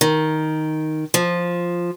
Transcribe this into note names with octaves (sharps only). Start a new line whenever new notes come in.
D#3
F3